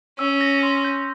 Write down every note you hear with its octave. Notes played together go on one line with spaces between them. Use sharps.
C#4 E6
A#6
C6
G6